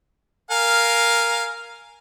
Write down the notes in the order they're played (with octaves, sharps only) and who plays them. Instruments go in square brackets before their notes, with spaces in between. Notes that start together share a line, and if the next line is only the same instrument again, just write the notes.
[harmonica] A#4 F5 G#5